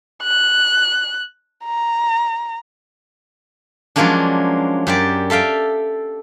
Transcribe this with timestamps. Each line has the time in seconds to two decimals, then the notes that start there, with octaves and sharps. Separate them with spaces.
0.23 F#6
1.65 A#5
3.96 F3 F#3 G#3 A#3 C#4 D4
4.87 F#2 G4 D5
5.30 A4 E5 F5 G5